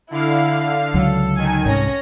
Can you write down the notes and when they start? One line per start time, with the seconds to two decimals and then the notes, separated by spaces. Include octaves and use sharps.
0.11 D3 E4 F5
0.94 C#2 D3 F#3 A4
1.35 D#3 G#5
1.66 C2 G#2 C#4 A#6